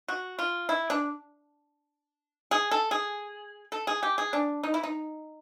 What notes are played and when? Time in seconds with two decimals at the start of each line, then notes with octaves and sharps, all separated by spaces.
0.08 F#4
0.39 F4
0.69 E4
0.90 D4
2.51 G#4
2.71 A4
2.91 G#4
3.72 A4
3.87 G#4
4.03 G4
4.18 G#4
4.33 D4
4.63 D#4
4.74 E4
4.83 D#4